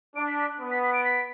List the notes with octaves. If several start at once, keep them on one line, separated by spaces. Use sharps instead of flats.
D4 D7
B6
B6
F#6
B3
B6
B6
D7
B6